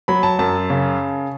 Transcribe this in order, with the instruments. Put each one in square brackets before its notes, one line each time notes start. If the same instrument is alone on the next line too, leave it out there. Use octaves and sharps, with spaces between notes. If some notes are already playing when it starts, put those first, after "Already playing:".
[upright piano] F#3 B5
A5
F#2 A5
C#3